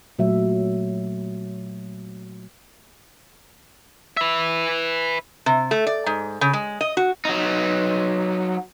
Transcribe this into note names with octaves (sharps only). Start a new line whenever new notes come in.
A#2 F#3 A3 E5
B4 E5
C3
A3
D5
G#2
C#3
G#3
D#5
F#4
F#3 D#4